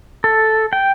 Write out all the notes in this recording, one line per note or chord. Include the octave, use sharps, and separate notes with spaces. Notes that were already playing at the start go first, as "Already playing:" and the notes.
A4
G5